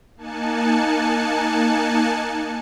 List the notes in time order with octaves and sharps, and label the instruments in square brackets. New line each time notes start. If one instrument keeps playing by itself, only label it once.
[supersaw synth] A#3 D#4 G#5 A5 F#6 C#7